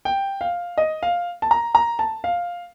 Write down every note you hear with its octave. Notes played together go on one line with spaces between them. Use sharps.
G5
F5
D#5
F5
A5
A#5
A#5
A5
F5